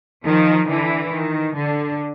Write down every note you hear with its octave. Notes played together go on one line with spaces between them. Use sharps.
D#3 F3
D3 E3
D#3
D3